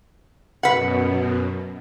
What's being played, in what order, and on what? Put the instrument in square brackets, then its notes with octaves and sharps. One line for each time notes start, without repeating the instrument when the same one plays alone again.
[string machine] F#2 B2 [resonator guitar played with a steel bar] B4 F#5